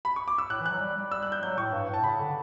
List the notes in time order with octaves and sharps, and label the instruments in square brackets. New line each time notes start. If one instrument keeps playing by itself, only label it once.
[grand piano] B5
C#6
D6
E6
[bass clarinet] A2 [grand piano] F#6
[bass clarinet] E3
[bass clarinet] F#3 [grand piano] F#6
[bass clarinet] G3
G3
[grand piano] E6
F#6
G6
[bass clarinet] F#3 [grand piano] G6
[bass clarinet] A2 [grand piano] C#6
[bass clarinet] G2
[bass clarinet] A2 [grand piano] A5
[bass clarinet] C#3 [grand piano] B5
[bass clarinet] D3